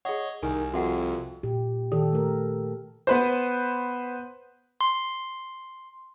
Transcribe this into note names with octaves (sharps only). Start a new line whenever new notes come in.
G#4 C#5 D#5 F#5
C2 D#3 A#4 G#5
F2 F#4 E5 F#5
A#2 G4
D#3 G4 A4
A3 A#4
B3 B4 C5
C6